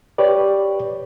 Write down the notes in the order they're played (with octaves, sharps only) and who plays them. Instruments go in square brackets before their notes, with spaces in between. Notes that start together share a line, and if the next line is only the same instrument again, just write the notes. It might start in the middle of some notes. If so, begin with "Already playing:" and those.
[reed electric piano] G4 B4 C#5 D5